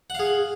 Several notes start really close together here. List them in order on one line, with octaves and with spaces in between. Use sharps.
F#5 F5 G#4